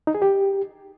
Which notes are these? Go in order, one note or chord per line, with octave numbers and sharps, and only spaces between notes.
D#4
G#4
G4